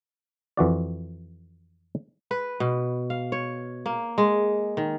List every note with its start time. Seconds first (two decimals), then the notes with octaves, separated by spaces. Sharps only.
0.57 F2 E3 F#4 D5
2.31 B4
2.60 B2
3.10 F5
3.32 C#5
3.86 A#3
4.18 G#3
4.77 D#3